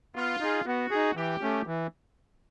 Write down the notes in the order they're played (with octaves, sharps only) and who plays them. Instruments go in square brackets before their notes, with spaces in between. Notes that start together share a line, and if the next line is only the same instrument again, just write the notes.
[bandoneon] B3 [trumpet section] F4
[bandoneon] D#4 G#4
[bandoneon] B3 [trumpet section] F#4
[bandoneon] D#4 G#4
[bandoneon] E3 [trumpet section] G4
[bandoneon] A3 C#4
E3